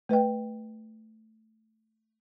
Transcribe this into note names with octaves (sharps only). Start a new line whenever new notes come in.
A3 B4 D#5 G5